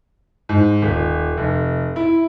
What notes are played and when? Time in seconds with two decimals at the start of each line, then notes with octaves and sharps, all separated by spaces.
0.49 G#2
0.82 D#1
1.37 F1
1.96 E4